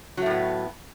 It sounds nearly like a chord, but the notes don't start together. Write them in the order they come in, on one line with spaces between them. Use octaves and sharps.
F#3 A3 A2 B3